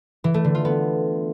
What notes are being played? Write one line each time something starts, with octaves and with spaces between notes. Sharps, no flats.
E3
A3
D3
F4
B3